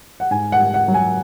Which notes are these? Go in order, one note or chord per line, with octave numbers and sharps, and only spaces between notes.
F#5
G#2 G#5
F#5
G#2
F#5
F#3
G#5